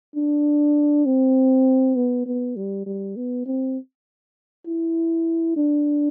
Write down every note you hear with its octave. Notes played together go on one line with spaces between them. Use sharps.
D4
C4
B3
B3
G3
G3
B3
C4
E4
D4